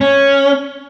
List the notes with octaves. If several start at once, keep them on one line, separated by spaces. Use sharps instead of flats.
C#4